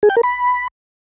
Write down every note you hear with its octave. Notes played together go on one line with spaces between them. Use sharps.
G#4
G5
A#4
B5